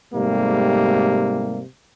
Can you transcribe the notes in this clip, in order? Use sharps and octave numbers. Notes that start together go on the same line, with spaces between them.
G#2 C3 G3 A3 A#3